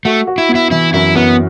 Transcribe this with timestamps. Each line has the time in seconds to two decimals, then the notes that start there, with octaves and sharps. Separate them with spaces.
0.05 A3 F#4
0.27 F#4
0.38 E4
0.49 B3
0.55 E4
0.71 E3 E4
0.94 F#2 E4
1.16 F#2 B3